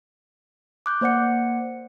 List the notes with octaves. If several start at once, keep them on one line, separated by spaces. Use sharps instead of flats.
D6 F#6 G6
A#3 C5 D5 F#5 C#7